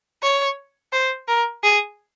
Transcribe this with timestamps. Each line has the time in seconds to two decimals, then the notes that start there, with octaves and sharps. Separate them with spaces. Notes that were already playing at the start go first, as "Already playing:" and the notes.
0.23 C#5
0.92 C5
1.28 A#4
1.63 G#4